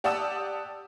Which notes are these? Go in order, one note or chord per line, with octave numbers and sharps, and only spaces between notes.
G4 D5 F#5 A5 D#6 E6